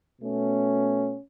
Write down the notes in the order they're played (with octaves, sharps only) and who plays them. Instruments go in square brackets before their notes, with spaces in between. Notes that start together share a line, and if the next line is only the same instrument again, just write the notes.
[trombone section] B2 A3 C#4